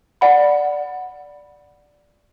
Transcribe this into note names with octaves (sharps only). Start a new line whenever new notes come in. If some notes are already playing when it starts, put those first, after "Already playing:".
D5 F#5 B5